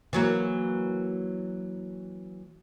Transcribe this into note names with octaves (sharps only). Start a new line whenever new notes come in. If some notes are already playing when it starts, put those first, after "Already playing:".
E3 F#3 A#3